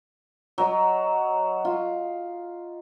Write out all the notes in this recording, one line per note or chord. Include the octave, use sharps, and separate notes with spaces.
F#3 D#5
F4